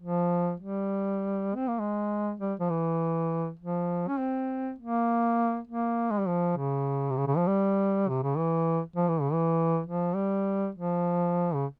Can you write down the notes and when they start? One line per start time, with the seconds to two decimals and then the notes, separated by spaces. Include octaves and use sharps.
0.01 F3
0.60 G3
1.56 C4
1.68 A#3
1.80 G#3
2.40 G3
2.60 F3
2.70 E3
3.59 F3
4.08 C#4
4.19 C4
4.79 A#3
5.68 A#3
6.11 G#3
6.20 G3
6.28 F3
6.57 C#3
7.10 C3
7.17 C#3
7.27 C#3
7.37 F3
7.48 G3
8.09 C3
8.23 C#3
8.36 E3
8.96 F3
9.09 E3
9.21 C#3
9.33 E3
9.87 F3
10.15 G3
10.75 F3
11.55 C#3